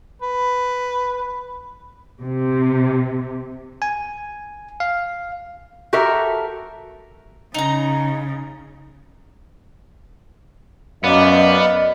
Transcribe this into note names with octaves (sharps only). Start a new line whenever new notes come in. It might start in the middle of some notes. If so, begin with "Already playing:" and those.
B4
C3
G#5
F5
F#4 G4 A4 A#4 E5
C#3 D#4 A#5
F#2 B3 D5 D#5 F5